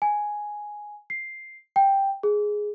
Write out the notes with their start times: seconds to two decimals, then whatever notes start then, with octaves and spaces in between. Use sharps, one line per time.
0.02 G#5
1.10 C7
1.76 G5
2.23 G#4